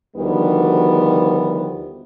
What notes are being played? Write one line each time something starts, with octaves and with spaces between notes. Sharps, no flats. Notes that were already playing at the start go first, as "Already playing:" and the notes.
D2 D#3 F3 G3 B3